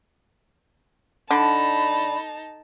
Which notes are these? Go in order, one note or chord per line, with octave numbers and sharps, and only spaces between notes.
D3 D#4 A5 B5